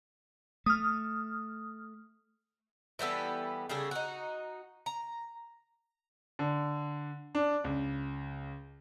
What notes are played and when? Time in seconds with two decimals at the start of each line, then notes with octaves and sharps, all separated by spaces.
0.66 A3 D#6 F6
2.99 E3 G3 B3 A4
3.69 C#3 G3 G#4 A4
3.91 D#4 F#4
4.86 A#5
6.39 D3
7.35 D4
7.64 C#2